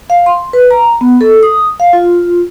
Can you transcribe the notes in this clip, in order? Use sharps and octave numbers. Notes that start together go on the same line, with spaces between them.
F5
C6
B4
A#5
B3
A4
D#6
F5
F4